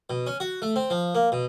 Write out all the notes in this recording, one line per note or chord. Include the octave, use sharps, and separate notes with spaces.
B2
C#4
F#4
A3
C4
F3
A#3
B2